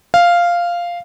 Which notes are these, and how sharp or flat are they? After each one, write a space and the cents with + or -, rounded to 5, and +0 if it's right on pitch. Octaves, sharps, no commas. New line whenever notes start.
F5 -5